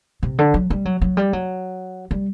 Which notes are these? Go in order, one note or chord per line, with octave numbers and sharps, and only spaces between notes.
C3
D3
F#3
G3
F#3
F#3
G3
F#3
G3